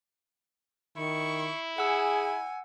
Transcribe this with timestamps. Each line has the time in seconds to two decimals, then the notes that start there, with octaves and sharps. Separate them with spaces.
0.97 D#3 E4 C#6
1.78 G#4 F#5 G#5 E6